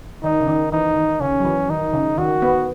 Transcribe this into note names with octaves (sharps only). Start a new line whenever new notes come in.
D#3 D#4
C#3
D#3
E3 D#4
D#3
C#3 C#4
F#3
E3
D#3 D#4
C#3
D#3 F#4
B3